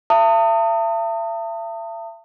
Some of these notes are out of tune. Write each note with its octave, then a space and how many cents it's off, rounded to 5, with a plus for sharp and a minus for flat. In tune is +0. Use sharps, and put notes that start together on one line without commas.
E5 +35 A5 +40 D#6 +0